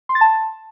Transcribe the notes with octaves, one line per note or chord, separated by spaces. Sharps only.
C6
A6
A5